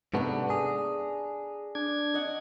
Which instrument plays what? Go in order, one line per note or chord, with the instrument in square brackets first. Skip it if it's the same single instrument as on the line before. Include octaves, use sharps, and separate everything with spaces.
[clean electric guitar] G#2 C3 B3 [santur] A3 D4 A#5
[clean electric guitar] G#4 [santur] A#5
[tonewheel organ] D4 G#6
[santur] D#5 F#5 C#6